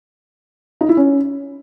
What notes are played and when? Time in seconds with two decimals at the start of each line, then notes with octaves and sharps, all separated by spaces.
0.81 D#4
0.89 E4
0.97 C#4